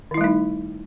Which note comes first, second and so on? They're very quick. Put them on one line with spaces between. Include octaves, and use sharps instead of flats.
D#3 E4 G3 A3 D#4